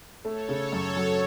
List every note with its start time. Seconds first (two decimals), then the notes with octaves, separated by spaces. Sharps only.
0.25 A3 A4 C#5
0.49 C#3
0.73 F#2
0.96 F#3